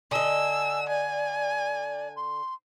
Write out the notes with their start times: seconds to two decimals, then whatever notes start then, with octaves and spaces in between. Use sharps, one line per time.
0.11 D3 D#5 G#5 E6
0.89 D5 G#5
2.16 C6